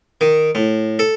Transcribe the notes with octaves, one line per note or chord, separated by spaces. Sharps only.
D#3
A2
A4